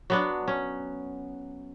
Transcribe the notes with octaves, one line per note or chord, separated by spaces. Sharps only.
F#3 B3 D4
C#4